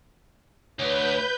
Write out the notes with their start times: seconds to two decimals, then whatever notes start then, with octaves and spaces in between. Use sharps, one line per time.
0.79 D2 B4 C#5 G6